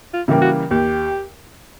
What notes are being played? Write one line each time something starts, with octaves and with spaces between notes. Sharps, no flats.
F4
C#3 E3 G3 A#3
F#4
D#2 G4